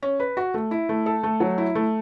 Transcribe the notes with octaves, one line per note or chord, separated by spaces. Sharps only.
C#4
B4
F#4
A3
E4
A3
A4
A3
F#3
E4
A3